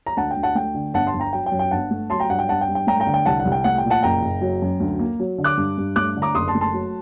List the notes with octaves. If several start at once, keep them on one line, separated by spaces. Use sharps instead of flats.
A#5
D2 F#5 A5
G5
D2
F#5 A5
A3 G5
D3
G1 F#5 A5
A5 C6
G1
G5 A#5
F#3 G5
G5
F#2
G5
G1 F#5 A5
A3
F#3 A5 C6
G5 A#5
G2 F#5
G5
G2 F#5 A5
G5
G2
G5
A3 G5 A#5
G5 A#5
D3
G5
C2 F#5 A5
F#5
C2
G5
A3 F#5
G5
A#2
F#5 A5
F#1 G5 A#5
F#1
F#3
F#2
D2
A#3
F#3
D3
D6 F#6
G2
G2
A3 D6 F#6
D3
A#5 D6
F#1 C6 D#6
A5 C6
A3
A5 C6
F#3